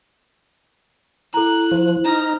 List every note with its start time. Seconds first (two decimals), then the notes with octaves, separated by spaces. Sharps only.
1.34 E4 A4 A#5 F#6
1.71 F3 C5
2.05 D#4 A#5 F6